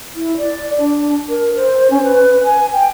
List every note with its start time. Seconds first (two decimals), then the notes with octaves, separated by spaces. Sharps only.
0.15 E4
0.37 D5
0.79 D4
1.29 A#4
1.56 C5
1.90 C#4
2.03 B4
2.44 G#5
2.73 G5